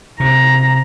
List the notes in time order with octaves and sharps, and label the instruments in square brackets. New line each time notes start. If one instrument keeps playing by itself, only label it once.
[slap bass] C3 [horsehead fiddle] A#5